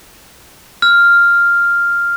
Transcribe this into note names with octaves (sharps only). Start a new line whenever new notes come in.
F6